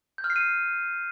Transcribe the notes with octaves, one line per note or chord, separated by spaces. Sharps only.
G6
F6
C7
D#7